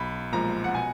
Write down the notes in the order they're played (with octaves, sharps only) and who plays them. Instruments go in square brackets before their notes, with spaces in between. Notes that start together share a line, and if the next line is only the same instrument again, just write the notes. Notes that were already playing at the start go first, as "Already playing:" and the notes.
Already playing: [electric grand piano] B1 [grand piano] B5
[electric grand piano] A#2 F3 G#3 [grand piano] A#5
[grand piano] F#5
[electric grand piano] B2 [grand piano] G#5